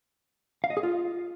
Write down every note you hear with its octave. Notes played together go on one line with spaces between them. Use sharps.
F5
D#5
G#4
F4